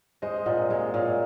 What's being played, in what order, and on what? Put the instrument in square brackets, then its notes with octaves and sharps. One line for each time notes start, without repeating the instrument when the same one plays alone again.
[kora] G#3 [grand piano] C5 D#5
[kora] A#2 [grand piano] D#5 F#5
[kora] G#3 [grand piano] F5 G#5
[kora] A#2 [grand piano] C#5 F5